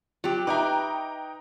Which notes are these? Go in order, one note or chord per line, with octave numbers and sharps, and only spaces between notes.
F#3 F4 G4
D#4 B4 E5 G5 A#5 D6